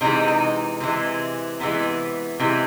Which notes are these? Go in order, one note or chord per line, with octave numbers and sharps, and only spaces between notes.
C3 E3 G#3 D#4
D#4
C3 E3 G#3
C3 E3 G#3 B3
C3 E3 G#3